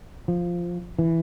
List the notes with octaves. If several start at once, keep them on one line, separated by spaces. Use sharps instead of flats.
F3
E3